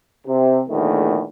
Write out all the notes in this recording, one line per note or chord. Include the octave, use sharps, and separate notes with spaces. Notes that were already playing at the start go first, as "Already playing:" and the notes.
C3
A#1 E2 D#3 A3